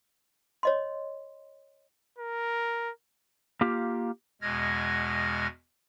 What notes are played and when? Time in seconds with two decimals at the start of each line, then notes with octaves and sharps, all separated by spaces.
0.63 C#5 D#5 C6
2.19 A#4
3.61 A#3 F4 G4
4.42 E2 B2 G#3 F6 G#6 A#6